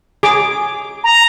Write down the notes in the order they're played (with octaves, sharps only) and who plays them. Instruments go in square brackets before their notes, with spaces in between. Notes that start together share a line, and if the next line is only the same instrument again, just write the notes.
[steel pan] G#4 D6
[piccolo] A#5